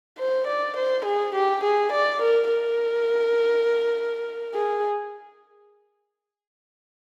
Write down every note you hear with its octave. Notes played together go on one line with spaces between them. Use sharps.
C5
D5
C5
G#4
G4
G#4
D5
A#4
A#4
G#4